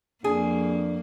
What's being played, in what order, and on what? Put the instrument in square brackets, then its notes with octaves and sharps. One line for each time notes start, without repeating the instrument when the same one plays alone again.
[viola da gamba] F2 A#3 [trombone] D4 [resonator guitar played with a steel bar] G#4